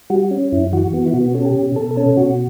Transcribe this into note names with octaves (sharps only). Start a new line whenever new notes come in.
G3 F#4
C#4
F#2 E4
E3 F#4
B3 F#4
E4
B2 F#4
C#4 A4
G4
B2
B2 A4
C#4 A4
B2 F#4